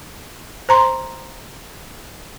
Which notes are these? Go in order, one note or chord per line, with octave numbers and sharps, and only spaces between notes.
C5 A#5 C6